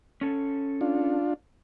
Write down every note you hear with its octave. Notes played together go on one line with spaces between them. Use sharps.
C#4 A4
D4 F4